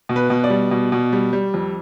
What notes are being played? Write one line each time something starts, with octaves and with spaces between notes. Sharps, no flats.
B2
B4
B2
D5
G3
B2
B2
G3
G3
F2